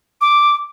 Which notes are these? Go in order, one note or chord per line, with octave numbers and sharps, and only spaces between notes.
D6